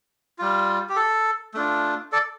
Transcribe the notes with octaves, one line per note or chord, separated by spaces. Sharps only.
G3 F4
G4
A4
A3 D4 F4
A4 D5